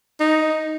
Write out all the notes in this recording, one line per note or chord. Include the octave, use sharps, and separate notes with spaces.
D#4